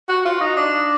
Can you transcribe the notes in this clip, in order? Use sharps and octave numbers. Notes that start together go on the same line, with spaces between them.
F#4
F4
D#4
D4